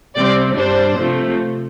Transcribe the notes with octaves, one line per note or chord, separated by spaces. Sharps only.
C3 G3 C4 D5
G2 G3 D4 C5
C3 F3 A3